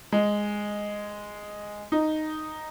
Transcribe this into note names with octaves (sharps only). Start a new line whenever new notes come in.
G#3
D#4